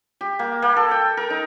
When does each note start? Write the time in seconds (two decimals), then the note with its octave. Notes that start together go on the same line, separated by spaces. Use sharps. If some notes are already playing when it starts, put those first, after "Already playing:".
0.21 G4
0.39 A#3
0.62 A#3
0.77 A4
0.91 G5
1.17 A#4
1.30 D#4